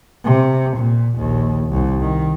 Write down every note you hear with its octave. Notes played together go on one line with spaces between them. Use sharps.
C3
A#2
A#1 D#2
C2
D#3